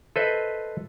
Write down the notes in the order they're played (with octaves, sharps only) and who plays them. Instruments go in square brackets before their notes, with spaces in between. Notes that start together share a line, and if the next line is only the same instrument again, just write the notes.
[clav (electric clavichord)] A4 B4 C5 D#5 E5